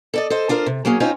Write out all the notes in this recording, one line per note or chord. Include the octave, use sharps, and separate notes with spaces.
A4 D5 D#5
A4 C5 D#5
D4 F4 A#4 C5
C3
F#3 A#3 C#4 G#4
C4 C#4 D#4 F4 C5 C#5